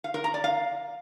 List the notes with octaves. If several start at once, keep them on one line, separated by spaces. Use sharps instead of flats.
F5
A#4
A#5
D5
F5